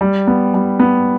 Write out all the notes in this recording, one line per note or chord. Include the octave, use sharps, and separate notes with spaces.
G3
B3
G3
B3